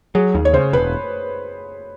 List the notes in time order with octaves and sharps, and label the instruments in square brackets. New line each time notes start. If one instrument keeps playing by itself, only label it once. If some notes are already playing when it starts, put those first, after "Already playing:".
[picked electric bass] F#3 [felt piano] G#4
[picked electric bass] D#2
[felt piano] C#5
[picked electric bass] C#3 [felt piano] C5
[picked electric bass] E1 [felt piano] B4